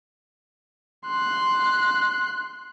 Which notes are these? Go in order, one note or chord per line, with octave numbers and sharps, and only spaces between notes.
C6 F#6